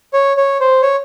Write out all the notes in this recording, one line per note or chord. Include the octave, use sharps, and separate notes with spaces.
C#5
C#5
C5
C#5